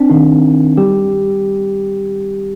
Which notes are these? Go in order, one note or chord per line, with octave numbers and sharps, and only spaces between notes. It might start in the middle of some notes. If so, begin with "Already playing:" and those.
Already playing: C4 D4
D#3 D#4
G3 G4